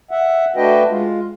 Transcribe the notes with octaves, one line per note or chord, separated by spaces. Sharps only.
E5 F#5
A3 D4 F#4 B4 D#5 G5
G#3 F4